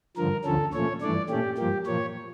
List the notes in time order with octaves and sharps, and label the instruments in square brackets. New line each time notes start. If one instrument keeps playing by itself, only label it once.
[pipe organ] G2 D3 F3 A#4
D2 D3 F3 C#4 A4
A#2 F3 A3 C#4 C#5
G2 E3 A3 D4 D5
A#2 A3 C#4 G4
G2 F3 A#3 G4
A#2 F3 A#3 C#5